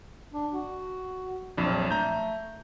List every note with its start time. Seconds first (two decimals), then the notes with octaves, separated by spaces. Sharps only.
0.33 D4
0.52 F#4
1.57 A#1 F2 F#3 D4
1.91 A3 A#5 G6